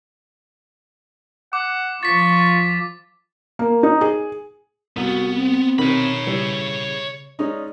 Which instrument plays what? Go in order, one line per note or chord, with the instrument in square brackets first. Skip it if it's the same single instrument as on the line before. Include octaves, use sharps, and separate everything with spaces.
[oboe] F#5 [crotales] D6
[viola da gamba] F3 F4 [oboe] C#6 [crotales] A6 B6
[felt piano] A#3
D#4
G#4
[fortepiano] C2 [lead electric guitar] B3 [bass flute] F#4
[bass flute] C4
[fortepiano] C3 D#3 C#4 [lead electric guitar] C#5 B5
[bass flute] C#3 [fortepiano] E3 G3
[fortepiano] G#3 C#4 D#4 [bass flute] D5